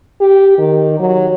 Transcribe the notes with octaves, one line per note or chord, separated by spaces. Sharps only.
G4
D#3
F#3